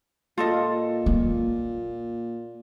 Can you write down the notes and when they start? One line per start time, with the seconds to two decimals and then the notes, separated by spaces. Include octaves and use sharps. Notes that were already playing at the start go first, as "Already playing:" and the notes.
0.38 A#2 F4 A4 D#5
1.06 A#3